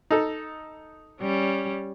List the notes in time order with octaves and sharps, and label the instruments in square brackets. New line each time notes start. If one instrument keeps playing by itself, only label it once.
[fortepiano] D#4 A4
[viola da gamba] G3 C#4